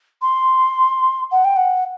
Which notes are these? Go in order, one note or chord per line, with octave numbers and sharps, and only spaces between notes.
C6
F#5
G5
F#5